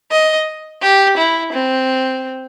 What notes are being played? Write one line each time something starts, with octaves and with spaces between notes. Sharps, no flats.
D#5
G4
E4
C4